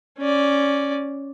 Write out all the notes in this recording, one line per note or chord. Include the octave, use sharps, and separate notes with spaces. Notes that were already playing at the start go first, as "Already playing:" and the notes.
C#4 D5